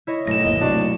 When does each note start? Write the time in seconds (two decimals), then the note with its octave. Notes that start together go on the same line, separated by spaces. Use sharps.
0.07 E4 C#5 D#5
0.27 B1 G#2 A3 A#6 E7
0.44 G1 D#2 A#3 D#5
0.61 C3 A3 C4 D4 F#4